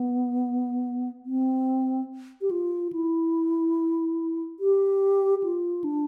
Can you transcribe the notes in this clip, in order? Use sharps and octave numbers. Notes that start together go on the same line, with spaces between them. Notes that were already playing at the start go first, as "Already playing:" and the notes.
Already playing: B3
C4
G4
F4
E4
G4
F4
D4